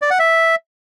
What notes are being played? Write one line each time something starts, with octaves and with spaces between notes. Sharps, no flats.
D5
F#5
E5